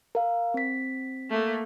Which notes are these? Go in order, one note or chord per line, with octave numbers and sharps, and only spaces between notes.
A#4 F5
C4 B6
A3 A#3